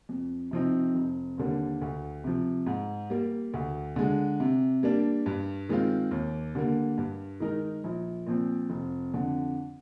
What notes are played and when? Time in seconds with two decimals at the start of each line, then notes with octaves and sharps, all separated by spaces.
0.09 F2
0.51 C3 F3 C4 D#4
0.95 F1
1.38 D#2 D3 G3 A#3
1.81 D2
2.24 C3 F3
2.66 G#2
3.10 G3 A#3
3.54 D2
3.96 D3 G#3
4.40 C3
4.83 G3 A#3 D4
5.26 G2
5.69 D#3 G#3 C4 F4
6.11 D#2
6.55 D3 G3 A#3
6.98 G2
7.40 D#3 G#3 D#4 A#4
7.84 A#1
8.26 A#2 F3 C4
8.70 F1
9.14 F2 D3